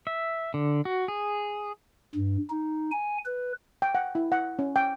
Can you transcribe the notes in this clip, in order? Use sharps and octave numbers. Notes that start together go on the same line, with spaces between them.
E5
D3
F#4
G#4
G2
D#4
G#5
B4
G5
F#5
E4
F#5
C#4
G5